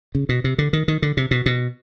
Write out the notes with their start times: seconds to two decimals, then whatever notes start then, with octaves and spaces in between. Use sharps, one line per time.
0.15 C#3
0.29 B2
0.44 C3
0.58 D3
0.73 D#3
0.88 D#3
1.02 D3
1.17 C3
1.31 B2
1.46 B2